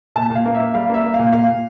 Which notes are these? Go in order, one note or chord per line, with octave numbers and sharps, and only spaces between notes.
A#2 A5
A#2
F5
A#3
E5
A#3
G3 F5
A#3 E5
A#3
F5
A#2
A#2 F5
A#2